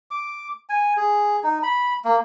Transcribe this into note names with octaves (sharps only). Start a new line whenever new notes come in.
D6
G#5
G#4
D#4
B5
A#3